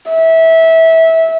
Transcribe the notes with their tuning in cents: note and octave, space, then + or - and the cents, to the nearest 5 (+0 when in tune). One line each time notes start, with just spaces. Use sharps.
E5 -20